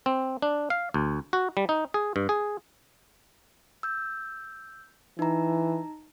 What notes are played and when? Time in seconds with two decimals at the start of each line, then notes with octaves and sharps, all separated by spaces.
0.06 C4
0.42 D4
0.70 F5
0.94 D2
1.33 F#4
1.57 G3
1.69 D#4
1.94 G#4
2.16 G2
2.29 G#4
3.83 E6 G6
5.19 E3 D#4 A#5